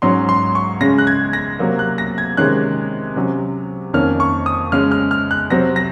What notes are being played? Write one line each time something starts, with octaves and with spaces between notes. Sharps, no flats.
G#2 F#3 C#4 C6
C6
C#6
C#3 G#3 C#4 A#6
F#6
G#6
A#6
C3 F#3 A#3
F#6
A#6
G#6
C3 D#3 G#3 C#4 F#6
C3 F#3 C#4
F2 D#3 A#3 C#4 F6
C#6
D#6
C#3 G#3 C#4 F6
F6
F6
F#6
C3 F#3 C4 A#6
A#6